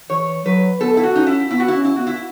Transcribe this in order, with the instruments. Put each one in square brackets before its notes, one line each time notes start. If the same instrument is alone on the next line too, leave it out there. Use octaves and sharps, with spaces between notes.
[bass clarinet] E3 [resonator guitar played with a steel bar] C#5
[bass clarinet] F#3 [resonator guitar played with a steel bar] B4
[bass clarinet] B3 [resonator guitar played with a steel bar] A4
[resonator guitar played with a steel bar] E4
F#4
[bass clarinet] C#4 [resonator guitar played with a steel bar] D#4
[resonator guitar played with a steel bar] E4
[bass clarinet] B3 [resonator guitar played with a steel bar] E4
[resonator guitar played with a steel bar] F#4
E4
[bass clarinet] C#4
[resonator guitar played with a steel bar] E4
[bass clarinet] B3 [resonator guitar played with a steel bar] F#4
[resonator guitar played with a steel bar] E4